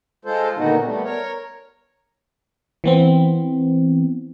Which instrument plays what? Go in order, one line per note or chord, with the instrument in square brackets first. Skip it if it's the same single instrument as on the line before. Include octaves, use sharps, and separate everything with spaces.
[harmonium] G#3 F4 A4 C5
A#2 D3 D#3 B3 D#4 F#4
G3 A3 B3
A#4 C#5
[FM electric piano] E3 B3 C4